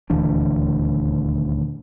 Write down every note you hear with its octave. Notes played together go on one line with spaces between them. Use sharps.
D#1 D2 E3 D4